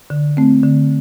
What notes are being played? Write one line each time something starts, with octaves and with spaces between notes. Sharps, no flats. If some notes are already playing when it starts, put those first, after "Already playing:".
D3
A3 C4
D3